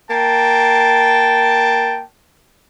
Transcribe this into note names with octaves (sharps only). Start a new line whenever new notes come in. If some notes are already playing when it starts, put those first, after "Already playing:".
A#3 G5 A5